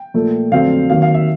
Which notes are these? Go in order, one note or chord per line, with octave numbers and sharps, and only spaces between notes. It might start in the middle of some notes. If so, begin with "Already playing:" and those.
Already playing: G5
A#2 F3 A3
F2 D3 F#3 A3 C4 F5
D#2 D#3 F#3 F5
F5
E5